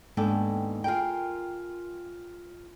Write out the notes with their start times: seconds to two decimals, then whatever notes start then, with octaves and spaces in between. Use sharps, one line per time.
0.17 D#2 G#2 B3 D4 A4 G5
0.84 F4 G#4 A#4 G5